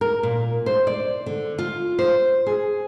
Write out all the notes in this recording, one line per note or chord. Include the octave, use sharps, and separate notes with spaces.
A#4
A#2
C5
D5
D3
F4
C5
G#4